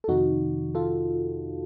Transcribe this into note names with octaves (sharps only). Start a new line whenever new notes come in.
A4
F2 C3 D#3 D#4 F#4
F4 A4